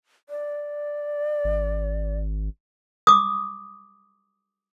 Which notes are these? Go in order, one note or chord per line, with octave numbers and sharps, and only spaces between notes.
D5
G#1
D6 D#6